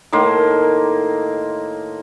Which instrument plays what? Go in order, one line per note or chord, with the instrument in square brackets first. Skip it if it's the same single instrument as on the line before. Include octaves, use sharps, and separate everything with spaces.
[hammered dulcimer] A2 D#3 A#3 C6